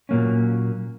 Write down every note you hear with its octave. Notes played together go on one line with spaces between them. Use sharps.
A#2 F#3 A#3 C#4